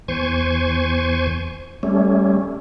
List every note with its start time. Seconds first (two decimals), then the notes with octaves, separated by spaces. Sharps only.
0.08 E2 C5 G#5 C#6
1.83 G3 A3 C#4